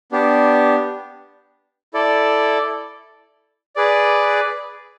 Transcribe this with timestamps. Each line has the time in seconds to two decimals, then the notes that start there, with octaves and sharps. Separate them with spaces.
0.12 B3 D4 G4
1.94 E4 A4 D5
3.76 G#4 B4 D5